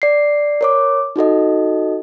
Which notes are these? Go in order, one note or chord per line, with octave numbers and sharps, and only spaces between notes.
D5 C7
A#4 C#5 D6
D#4 F#4 A4 D#5